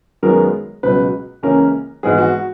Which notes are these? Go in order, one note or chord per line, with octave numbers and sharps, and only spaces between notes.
F#2 D#3 G#3 B3 A#4
C#2 B2 F#3 B4
C#2 C#3 E3 A#3 C#4 A#4
G#1 G#2 E3 G#3 B3 G#4
F#4